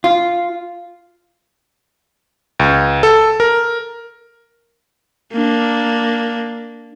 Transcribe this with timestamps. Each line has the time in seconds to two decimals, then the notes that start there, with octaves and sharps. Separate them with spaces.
0.04 F4
2.59 C#2
3.03 A4
3.40 A#4
5.33 A#3 D4